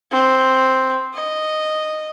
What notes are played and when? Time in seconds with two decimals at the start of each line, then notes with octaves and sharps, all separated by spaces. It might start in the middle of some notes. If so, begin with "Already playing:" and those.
0.12 C4
1.14 D#5